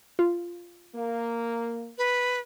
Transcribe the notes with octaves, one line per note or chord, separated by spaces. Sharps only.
F4
A#3
B4